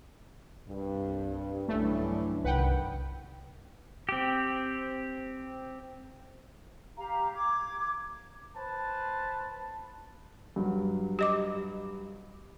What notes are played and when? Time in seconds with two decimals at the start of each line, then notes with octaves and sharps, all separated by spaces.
0.68 C2 G2
1.68 B1 G2 D3 E3 A3 C#4 D4
2.44 C2 F#2 D#3 B4 F#5 G5
4.09 C4 G4
6.97 G4 F5 A#5
7.33 D6 G#6
8.56 B4 C5 A5
10.56 G2 F#3
11.19 G4 D#5 D6